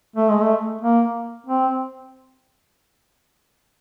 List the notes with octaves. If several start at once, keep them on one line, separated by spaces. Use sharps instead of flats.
A3
G#3
A3
A#3
C4